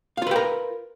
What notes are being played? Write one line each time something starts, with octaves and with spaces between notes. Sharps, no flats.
F4 G4 A#4 B4 F5